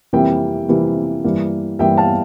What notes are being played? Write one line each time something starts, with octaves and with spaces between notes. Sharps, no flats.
F2 C3 E3 G3 A#3 E5 G5
F2 C3 E3 G3 A#3
G2 E3 A#3
G2 E3 A#3 E5 G5
F5 A5